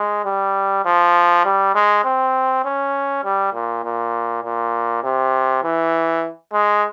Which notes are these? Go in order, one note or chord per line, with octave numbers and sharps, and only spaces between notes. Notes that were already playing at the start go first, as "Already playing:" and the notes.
Already playing: G#3
G3
F3
G3
G#3
C4
C#4
G3
A#2
A#2
A#2
C3
E3
G#3